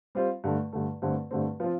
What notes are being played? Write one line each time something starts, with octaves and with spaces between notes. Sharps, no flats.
G3 C4 F4 C5
G2 D3 A3
G2 D3 A3
G2 D3 A3 C4
G2 D3 A3 C4
F3 C4 F4